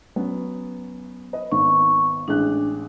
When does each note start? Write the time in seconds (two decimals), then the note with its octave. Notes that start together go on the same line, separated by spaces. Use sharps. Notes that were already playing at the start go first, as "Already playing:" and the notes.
0.16 F#3 B3 C#4
1.33 B4 D#5
1.52 G#1 D#3 B3 C#6
2.28 A1 G#3 D4 F#6